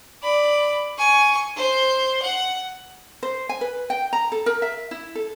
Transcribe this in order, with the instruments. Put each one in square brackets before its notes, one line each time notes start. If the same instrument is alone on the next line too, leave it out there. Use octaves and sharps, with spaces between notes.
[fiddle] D5 B5
G#5 C#6
C5
F#5
[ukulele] C5
G#5
B4
G5
A#5
A4
A#4
E5
E4
A4